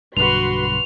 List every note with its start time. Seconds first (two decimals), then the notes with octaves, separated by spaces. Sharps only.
0.17 B1 G2 D3 F#4 B4 C6 F7